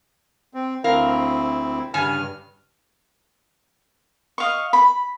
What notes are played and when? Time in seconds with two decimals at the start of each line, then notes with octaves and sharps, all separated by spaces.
0.54 C4
0.84 D2 C4 E4 A#4 F5
1.94 G2 C#3 G#5 F6
4.38 D#5 F5 C#6
4.73 B5